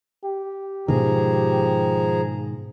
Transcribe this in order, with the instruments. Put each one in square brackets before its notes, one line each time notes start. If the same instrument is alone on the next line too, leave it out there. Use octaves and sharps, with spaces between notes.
[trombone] G4
[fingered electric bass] G#2 B2 D#3 [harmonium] F3 G#4 A#5